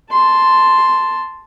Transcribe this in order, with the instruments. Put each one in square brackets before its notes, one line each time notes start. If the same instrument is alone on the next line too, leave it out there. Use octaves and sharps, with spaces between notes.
[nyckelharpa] A5 C6